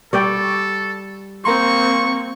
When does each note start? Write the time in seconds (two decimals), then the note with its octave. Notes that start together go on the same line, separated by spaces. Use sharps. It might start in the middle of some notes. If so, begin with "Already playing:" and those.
0.13 G3 A4 D5 G5 C#6
1.45 A#3 C4 A#4 A#5 C6 C#6